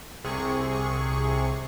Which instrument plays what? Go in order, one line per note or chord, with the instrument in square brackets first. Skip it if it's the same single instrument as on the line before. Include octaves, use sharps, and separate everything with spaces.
[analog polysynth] C2 C3 G#4 C#6